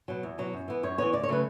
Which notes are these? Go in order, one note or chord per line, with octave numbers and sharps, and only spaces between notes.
B2 F#3
E2
B2 F#3
F#2
E3 B3
F#2 C#5
E3 B3 C#5
D2 D5
C#5
C#3 F#3 A3 B4